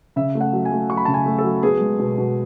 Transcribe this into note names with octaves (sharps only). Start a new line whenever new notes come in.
C#3 E5
A3
F#5
F#3
G#5
A3
F#3 C#6
B5
C#3 A5
G#5
A3
A4
F#3
B3 G#4
G#3
B2
B2